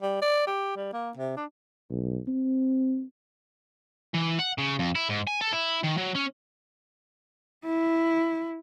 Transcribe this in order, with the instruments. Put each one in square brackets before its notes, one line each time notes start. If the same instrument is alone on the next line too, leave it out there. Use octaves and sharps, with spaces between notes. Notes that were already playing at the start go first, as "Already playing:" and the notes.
[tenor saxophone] G3
D5
G4
G3
A#3
C3
D4
[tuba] B1
C4
[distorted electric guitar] E3
F#5
C#3
F2
E4
G#2
G#5
A4
E4
D#3
F#3
C#4
[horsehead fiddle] E4